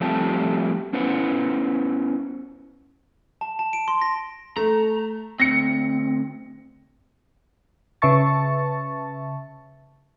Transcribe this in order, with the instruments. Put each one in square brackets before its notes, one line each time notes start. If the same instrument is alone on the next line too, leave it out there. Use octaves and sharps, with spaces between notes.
[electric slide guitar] F3 G3 A3 C4 G4 A5
B3 C#4 E4 B4 C5 F#5
[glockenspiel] A5
A5
D7
C6
A#6
[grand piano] A3 [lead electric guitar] A#5
[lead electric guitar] D2 C4 [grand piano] A#6 C#7
[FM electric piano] C#3 B4 E5 A5 C#6 A6